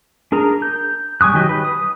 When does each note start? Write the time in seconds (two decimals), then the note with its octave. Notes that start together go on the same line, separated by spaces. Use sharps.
0.32 D4 G#4 A#4 A#5
0.62 G6
1.21 G3 G#5 C#6 D#6 F#6
1.34 D#3 F#3 G4 D#5
1.49 B4
1.64 D#6